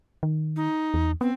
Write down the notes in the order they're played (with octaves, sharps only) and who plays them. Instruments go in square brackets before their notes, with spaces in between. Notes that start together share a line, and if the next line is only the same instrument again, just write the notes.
[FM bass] D#3
[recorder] D#4
[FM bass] E2
[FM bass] B3 [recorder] C4